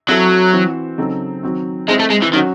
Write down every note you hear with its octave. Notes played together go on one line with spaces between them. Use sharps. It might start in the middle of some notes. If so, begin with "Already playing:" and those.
F#3 C4 E4 A4
E3 C4 F#4 C5
C#3 F#3 C4 D#4 A4
D#3 F#3 C4 F#4
G#3 C4 E4 C5 D#5
A3
G#3
E3
D#3 F#3 C#4 F#4